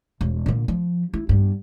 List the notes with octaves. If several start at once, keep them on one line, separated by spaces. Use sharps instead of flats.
E1
A#2 D3
F3
E4
G2 B3